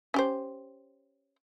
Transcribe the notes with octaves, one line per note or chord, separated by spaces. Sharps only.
C#4 G4 C5